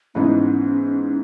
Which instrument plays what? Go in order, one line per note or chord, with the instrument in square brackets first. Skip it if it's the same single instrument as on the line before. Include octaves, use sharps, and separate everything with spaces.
[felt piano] G#2 E3 B3 D#4 [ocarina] C#4